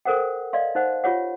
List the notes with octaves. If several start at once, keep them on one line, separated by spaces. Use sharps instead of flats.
A4 A#4 C5 F#5 G5
D5 D#5 F5 C6
D#4 C5 F#5
F4 G4 C#5 F#5